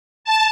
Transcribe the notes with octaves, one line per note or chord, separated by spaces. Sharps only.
A5